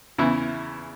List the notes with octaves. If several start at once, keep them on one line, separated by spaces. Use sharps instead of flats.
E2 C#3 E3 E4